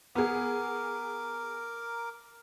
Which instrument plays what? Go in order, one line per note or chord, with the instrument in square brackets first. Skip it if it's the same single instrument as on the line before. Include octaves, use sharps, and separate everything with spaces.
[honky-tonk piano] B3 G#4 [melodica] A#4 D6